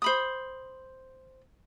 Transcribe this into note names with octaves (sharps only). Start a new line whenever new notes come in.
C5 B5 D#6